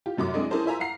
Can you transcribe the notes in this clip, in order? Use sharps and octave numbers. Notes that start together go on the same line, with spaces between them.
F4 G4
F1 F#2 F#3 D6
G#3 C4 D4 E4 G#4 D#5
C#4 E4 G#4 A#4 C5 A5
F4 C5 E5 G#5 A#5
F5 F#5 A#5 C7